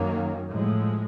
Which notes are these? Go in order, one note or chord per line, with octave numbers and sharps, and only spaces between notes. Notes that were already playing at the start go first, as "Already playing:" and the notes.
Already playing: F#2 D#3 F#3 A#3 C#4
A2 F3 G#3